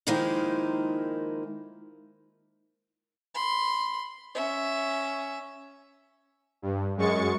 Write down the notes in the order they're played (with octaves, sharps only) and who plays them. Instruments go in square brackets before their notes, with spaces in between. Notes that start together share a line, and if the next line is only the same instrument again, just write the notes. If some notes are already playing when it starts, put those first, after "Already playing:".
[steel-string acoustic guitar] D#3 F3 G#3 A#3 D#4 E4
[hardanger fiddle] B5 C6
C#4 E5
[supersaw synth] G2
F#2 G#3 C#6 A6 C#7